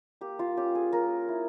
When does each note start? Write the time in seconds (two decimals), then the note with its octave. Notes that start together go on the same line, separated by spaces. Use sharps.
0.21 A#3 G4
0.39 F4
0.57 C#4 G4
0.75 G#4
0.93 A#3 A#4
1.29 E4